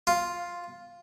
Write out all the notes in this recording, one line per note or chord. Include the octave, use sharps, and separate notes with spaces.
F4